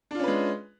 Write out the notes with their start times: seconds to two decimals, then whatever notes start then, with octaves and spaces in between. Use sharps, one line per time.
0.11 D4
0.15 F4
0.19 C#4
0.23 B4
0.28 G#3